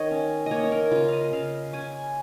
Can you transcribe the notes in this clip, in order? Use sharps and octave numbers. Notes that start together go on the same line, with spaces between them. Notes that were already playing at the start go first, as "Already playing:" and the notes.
Already playing: D#3 C#5 D#5
C#4
A#3 C#5 D#5
C#5
A#4
C#3 F4
D#5 F5
C#3 F5
C#4 G#5